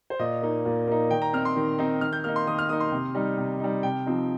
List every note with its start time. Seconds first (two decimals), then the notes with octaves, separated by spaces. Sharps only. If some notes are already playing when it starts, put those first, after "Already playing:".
0.10 C5
0.19 A#2 D#5
0.42 A#3 D#4
0.66 A#2
0.87 A#3 D#4
1.11 D#3 G5
1.22 A#5
1.33 C4 D#4 F6
1.45 C6
1.56 D#3
1.79 C4 D#4
2.01 D#3 F6
2.13 G6
2.24 A#3 D#4 F6
2.36 C6
2.47 D#3 D#6
2.59 F6
2.69 A#3 D#4 D#6
2.80 C6
2.92 C3
3.15 G3 D#4
3.38 C3
3.60 G3 D#4
3.83 C3 G5
4.06 F3 C4 D#4